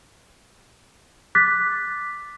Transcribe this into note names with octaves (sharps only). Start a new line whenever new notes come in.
D6 F#6 A6 B6